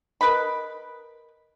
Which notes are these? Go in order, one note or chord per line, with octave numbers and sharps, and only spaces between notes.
A#4 B4 D#5 B5